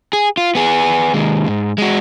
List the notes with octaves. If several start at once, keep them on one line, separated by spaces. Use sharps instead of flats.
G#4
F4
B3 G#4
D#2 G#3
G#2
G#3 F#4